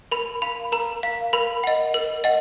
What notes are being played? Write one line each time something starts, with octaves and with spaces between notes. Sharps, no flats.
A#4 B5
F5 B5
A#4 A#5
F5
A#4 B5
D#5 F#5
A#4
D#5 F#5